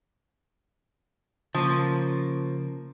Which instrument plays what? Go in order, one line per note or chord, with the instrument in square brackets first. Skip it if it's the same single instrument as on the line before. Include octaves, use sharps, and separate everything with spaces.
[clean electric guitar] C#3 A#3 [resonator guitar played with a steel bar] F3